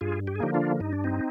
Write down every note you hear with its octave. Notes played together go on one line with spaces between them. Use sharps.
G2 F4 G#4
G4
G#4
D3 F3 A#3 D#4 G4
D4 F4
G2 D#4
D4
C4 D#4